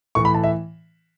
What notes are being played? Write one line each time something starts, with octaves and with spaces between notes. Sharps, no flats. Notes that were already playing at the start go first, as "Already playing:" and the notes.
A2 E3 C#6
B5
A5
E5